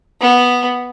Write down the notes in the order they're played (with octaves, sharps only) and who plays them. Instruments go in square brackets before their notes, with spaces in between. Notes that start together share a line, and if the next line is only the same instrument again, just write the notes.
[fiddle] B3